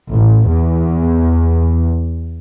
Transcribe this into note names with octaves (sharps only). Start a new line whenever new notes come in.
A1
E2